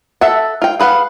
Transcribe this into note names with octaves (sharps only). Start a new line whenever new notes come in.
A4 E5 F#5
F4 G5
G#4 B4 F5 F#5